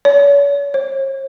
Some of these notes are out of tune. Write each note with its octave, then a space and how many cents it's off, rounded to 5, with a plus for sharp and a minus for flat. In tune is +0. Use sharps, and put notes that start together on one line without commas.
C#5 +40
C#5 -45